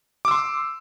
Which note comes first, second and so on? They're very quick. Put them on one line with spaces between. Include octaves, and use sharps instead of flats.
D6 E6 C6